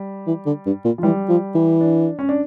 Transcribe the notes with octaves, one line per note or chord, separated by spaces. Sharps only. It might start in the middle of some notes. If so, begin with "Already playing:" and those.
Already playing: G3
E3
D3
G2
A#2
F3
E3 G3
F3
E3
D4
C#4
D4